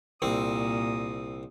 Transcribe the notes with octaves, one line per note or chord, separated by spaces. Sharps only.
C2 A#2 C4 D#6